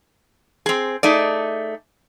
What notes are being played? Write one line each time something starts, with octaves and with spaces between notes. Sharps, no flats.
C4 G#4
A3 D#4 G#4 D5